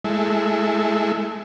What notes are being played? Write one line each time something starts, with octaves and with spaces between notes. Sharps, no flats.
G#3 A3 E4